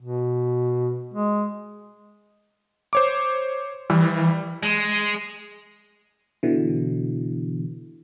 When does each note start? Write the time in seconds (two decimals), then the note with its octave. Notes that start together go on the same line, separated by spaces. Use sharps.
0.01 B2
1.14 G#3
2.93 C5 C#5 D6
3.90 E3 G3
4.63 G#3
6.43 B2 D3 E3